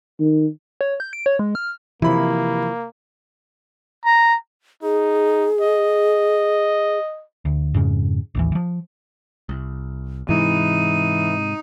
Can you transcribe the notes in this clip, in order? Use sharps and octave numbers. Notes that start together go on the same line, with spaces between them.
D#3
C#5
G6
D7
C#5
G#3
F6
C3 E3 F3 A#3 E4 B5
A#5
D#4 G#4
D#5
D2
F2 G#2 C#3
A1 D#2 E3
E3 F3
C2
G#2 C3 E3 G#3 D#4 D#7